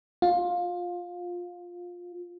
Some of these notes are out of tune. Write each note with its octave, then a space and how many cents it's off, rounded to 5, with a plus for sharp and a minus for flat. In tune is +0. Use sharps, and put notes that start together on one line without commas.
F4 +15